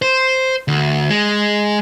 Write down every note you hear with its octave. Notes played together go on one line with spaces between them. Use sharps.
C5
D2
G#3